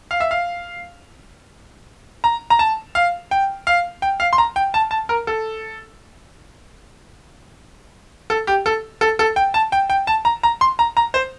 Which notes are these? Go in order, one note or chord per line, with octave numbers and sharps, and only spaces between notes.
F5
E5
F5
A#5
A#5
A5
F5
G5
F5
G5
F5
C6
A#5
G5
A5
A5
A#4
A4
A4
G4
A4
A4
A4
G5
A5
G5
G5
A5
A#5
A#5
C6
A#5
A#5
C5